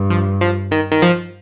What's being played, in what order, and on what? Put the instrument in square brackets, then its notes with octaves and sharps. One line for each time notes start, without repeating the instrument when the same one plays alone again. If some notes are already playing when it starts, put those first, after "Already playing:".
Already playing: [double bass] G2
[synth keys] F3
F3
D#3
D#3
F3